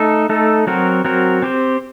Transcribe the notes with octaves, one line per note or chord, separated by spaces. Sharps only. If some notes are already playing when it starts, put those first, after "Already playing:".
Already playing: A3 D#4 A4
A3 D#4 A4
F#3 C4 F#4 A#4
F#3 C4 F#4 A#4
C4 G4 C5